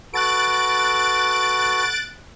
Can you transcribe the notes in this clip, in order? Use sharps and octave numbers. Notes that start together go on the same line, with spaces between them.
F#4 A4 B4 F#6 A6 D7